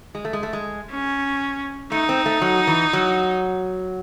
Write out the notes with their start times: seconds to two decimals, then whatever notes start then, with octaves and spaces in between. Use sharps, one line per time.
0.15 G#3
0.25 A3
0.33 G#3
0.43 A3
0.53 G#3
0.91 C#4
1.92 A3 D#4
2.09 C4
2.26 A3
2.42 F#3
2.67 E3
2.93 F#3